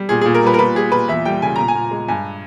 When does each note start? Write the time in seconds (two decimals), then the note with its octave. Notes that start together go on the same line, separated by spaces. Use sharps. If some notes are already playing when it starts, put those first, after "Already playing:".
Already playing: G3
0.09 A#2 G#4
0.21 A#2 G#4
0.34 A#4
0.43 G3 B4
0.54 A#4
0.59 A#2 B4
0.75 G3 G#4
0.92 A#2 B4
1.08 E2 E5
1.25 G3 G5
1.42 C#3 G#5
1.56 A#2 A#5
1.68 G#5
1.75 A#2
1.91 G#3
2.08 G2 G#5